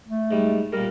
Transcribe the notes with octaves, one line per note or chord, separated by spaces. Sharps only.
A3
G#2 G3
A#2 G3 A#4